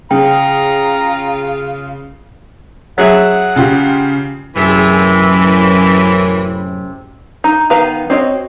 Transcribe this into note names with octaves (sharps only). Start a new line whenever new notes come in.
C#3 F4 G5 A#5
F#3 G#4 E5 F#5
C#3 F4 G4
F#2 A2 C3 E3 G#4 E5
D#4
D#3 B3 B4 F5 A#5
C4 D4 F#4 C#5 D#5